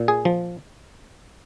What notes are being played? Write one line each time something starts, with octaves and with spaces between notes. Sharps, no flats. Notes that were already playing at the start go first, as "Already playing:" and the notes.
Already playing: A#2
G#4
F3